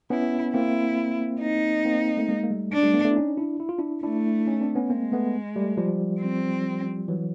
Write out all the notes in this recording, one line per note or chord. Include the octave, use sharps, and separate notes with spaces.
B3 C#4 E4
A#3 C4 E4
D#4
A#3 C4
A3
G#3 A#3
A#3
G3 A3
D4
G3 A3
A3 B3
A3 B3
E4
C#4 D#4
D4 E4
E4
F4
D4 E4
A3 D4 E4
C#4 D#4
C4 D4
B3 C#4
G#3 A#3 C4
A3 B3
G3 A3
F3 G3
C4
E3 F#3